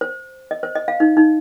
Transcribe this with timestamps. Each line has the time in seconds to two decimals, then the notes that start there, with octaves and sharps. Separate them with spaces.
0.01 C5
0.51 D#5
0.63 C5
0.75 D#5
0.88 F5
1.00 D#4
1.17 D#4